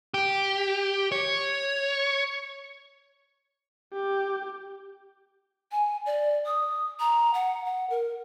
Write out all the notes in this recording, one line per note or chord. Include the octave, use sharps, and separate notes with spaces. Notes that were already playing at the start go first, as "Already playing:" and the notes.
G4
C#5
G4
G#5
D5
D#6
A#5
F#5
F#5
A#4